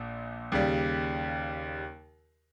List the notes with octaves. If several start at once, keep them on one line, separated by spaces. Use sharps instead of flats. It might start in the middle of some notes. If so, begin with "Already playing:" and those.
Already playing: A#1 A#2
D#2 C#3 G3